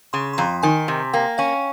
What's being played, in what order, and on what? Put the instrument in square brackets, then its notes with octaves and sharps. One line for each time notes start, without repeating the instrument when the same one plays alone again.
[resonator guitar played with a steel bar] C#3 [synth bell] C6
[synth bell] C6
[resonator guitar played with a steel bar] F2 [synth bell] A#5
[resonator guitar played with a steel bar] D#3 [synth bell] G#5
[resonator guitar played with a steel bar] C3
[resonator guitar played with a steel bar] A#3 [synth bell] G5
[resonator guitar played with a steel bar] C#4 [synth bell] F5